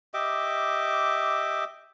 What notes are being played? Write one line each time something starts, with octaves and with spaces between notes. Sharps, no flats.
G4 D#5 E5 D6